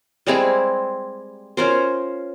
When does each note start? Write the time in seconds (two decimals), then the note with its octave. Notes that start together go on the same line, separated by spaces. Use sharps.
0.27 G3 G#3 C4 E4
1.57 C#4 F4 A#4 C5